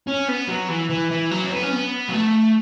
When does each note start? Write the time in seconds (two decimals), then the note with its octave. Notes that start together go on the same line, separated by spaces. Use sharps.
0.07 C#4
0.28 B3
0.48 F#3
0.69 E3
0.90 E3
1.11 E3
1.31 F#3
1.43 C#4
1.52 B3
1.63 C#4
1.72 B3
2.09 F#3
2.13 A3